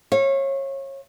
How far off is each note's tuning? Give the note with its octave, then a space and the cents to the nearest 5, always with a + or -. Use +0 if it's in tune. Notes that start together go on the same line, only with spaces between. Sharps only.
C#5 -25 F5 -35